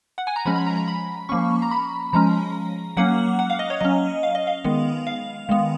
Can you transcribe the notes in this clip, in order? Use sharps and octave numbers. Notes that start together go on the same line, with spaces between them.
F#5
G#5
A#5
F3 G#3 C#4 B5
B5
A#5
A#5
B5
F3 A#3 C#4 C#6
A#5
B5
F3 G#3 C#4 A#5
F#3 A#3 C#4 F#5
F#5
F5
D#5
C#5
F#3 C#4 D#5
F5
D#5
F5
D#3 G#3 B3
F5
D#3 G#3 B3